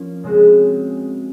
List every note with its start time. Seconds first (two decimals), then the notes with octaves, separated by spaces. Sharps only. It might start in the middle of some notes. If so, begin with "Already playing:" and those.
Already playing: F3 A#3 C#4
0.23 C#3 G#3 C4 F#4